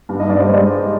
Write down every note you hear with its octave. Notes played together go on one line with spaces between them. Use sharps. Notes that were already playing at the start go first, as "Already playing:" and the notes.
G2
D#4 D#5
G2 D5
C5
G#3 D5